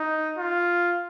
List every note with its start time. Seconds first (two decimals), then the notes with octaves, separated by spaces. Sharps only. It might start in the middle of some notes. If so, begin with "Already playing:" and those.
Already playing: D#4
0.38 F4